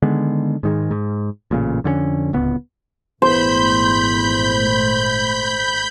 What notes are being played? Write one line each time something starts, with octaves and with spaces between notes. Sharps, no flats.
D3 D#3 G#3 B3
G#2 D#3 G#3
G#2
A1 A#2 C#3
F2 D3 G3 C#4
D1 C#2 B3
G#1 E2 A#2 A3 C5 B5 G6